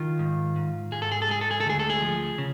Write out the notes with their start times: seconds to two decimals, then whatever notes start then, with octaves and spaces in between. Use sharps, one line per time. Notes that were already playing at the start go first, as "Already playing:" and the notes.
Already playing: D#3 F4
0.19 G#2
0.56 G#2
0.92 G#2 G#4
1.02 A4
1.12 G#4
1.22 A4
1.28 G#3 G#4
1.41 A4
1.51 G#4
1.60 A4
1.66 D2 G#4
1.80 A4
1.90 G#4
2.02 F3
2.38 C#3